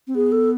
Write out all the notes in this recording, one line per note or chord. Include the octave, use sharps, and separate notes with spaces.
C4
B3 G#4
A4